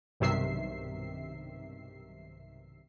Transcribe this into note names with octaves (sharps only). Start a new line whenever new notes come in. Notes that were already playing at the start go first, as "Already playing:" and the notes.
B1 G2 C3 D#3 E5 C7